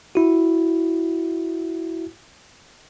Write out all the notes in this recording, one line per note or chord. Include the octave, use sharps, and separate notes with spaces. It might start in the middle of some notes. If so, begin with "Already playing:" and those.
E4 F#4